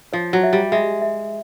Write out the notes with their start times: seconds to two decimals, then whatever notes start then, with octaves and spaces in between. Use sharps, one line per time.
0.13 F3 C#5
0.33 F#3
0.43 E5
0.53 G3
0.72 G#3 E5
1.02 E5